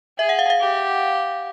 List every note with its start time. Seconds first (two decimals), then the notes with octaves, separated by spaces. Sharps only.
0.18 G#4 E5
0.29 F#5
0.39 F5
0.50 F5
0.60 G4